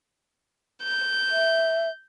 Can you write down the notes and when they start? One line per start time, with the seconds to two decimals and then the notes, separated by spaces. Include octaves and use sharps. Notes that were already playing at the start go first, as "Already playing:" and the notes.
0.82 G6
1.32 E5